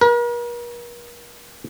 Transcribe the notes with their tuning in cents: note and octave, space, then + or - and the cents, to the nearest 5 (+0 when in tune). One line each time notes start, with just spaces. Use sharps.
A#4 +45